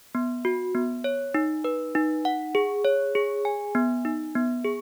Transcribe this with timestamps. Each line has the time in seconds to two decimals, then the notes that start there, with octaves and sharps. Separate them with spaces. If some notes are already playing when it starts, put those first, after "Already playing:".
0.15 B3
0.45 F#4
0.75 B3
1.04 C#5
1.34 D#4
1.64 B4
1.95 D#4
2.25 F#5
2.55 G#4
2.85 C#5
3.15 G#4
3.45 G#5
3.75 B3
4.05 D#4
4.35 B3
4.65 G#4